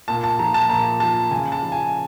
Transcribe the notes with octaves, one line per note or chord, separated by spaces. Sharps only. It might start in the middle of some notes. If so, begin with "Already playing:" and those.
A#2 A5
A5
F3 A#5
A5
A#2 A#5
F3 A5
C#3 G#5
A5
F3
G#5